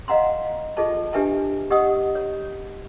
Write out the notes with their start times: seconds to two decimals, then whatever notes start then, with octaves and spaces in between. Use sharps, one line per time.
0.08 D#5 F5 F#5 A#5 C6
0.77 F4 G#4 A4 D#5 A5
1.13 D4 G4 B4 E5 G#5 A5
1.70 G4 D#5 F#5 D#6
2.15 C#5